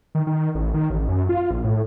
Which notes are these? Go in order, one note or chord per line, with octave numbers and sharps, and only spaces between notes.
D#3
D#3
A1
D#3
A1
F#2
F4
A#1
A2